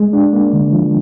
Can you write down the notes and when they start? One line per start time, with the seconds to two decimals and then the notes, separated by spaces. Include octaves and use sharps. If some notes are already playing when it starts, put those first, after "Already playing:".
Already playing: G#3
0.13 D4
0.33 A#3
0.53 D3
0.73 F3